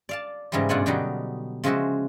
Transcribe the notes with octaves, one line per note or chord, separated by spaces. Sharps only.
D5 F5 A5
G#2 C#3 E3 F#3 G3
G2 B2 F4 D5 F#5 G#5
B2 D3 F#3 G3 D#4
C#3 F3 G#3 F#4 G#4 E5